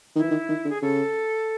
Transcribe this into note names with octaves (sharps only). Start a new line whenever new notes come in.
D#3 E4
E3
D#3
D#3
D3
G#4
C#3 A4